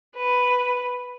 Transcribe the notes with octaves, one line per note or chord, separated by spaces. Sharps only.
B4